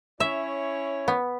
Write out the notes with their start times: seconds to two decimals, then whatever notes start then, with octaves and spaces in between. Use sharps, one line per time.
0.20 C#4 E4 C#5 E5
1.08 B3